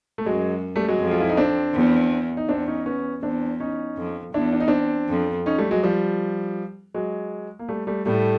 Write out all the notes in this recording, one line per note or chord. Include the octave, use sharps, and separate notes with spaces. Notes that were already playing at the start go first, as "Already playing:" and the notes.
A3
F#2 F#3 G#3
G3 A3
F#3 G#3
F2
F4
E4
D#4
C4 D4
E2
D#4
E2 C4 D4
C#4 D#4
B3 C#4
E2 C4 D4
C#4 D#4
F2
E2 D4 E4
D4
D#4
C4 D4
F2
C#4 D#4
G3 A3
F#3 G#3
F3 G3
F#3 G#3
A#3
G3 A3
G3 A3
A2 G3 A3